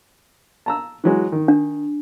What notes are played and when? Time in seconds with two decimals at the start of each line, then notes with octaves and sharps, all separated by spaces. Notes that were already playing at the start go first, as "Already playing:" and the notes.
0.66 A5 A#5 E6
1.04 E3 F#3 G#3
1.32 D#3
1.48 D4